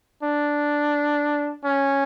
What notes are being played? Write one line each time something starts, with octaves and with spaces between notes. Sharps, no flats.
D4
C#4